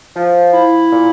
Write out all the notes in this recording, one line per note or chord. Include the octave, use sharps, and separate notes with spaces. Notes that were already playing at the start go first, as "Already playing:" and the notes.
F3
E4
A#2